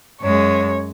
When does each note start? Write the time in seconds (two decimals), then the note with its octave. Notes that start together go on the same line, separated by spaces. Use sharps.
0.22 F#2 G#3 C#5